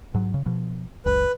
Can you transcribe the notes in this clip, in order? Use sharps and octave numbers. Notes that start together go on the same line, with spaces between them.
G#2 F#3
C#3
B2 F3
F#1 C#2 B4